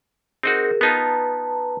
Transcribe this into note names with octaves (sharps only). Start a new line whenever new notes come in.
C4 D#4 F#4 G#4 A#4
B3 D#4 F4 B4 A5 A#5